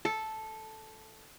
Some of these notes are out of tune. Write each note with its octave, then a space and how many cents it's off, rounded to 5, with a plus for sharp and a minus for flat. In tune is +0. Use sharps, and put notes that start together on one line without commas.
A4 -5